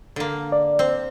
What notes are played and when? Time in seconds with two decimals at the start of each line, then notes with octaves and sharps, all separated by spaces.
0.16 D3 A#3
0.52 D5
0.79 C4